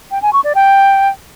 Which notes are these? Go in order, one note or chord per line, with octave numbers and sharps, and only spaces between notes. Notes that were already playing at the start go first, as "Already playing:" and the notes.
G5
G#5
C#6
D5
G5